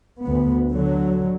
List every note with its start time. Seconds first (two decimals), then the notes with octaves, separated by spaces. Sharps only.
0.23 D2 B3
0.71 D3 F#3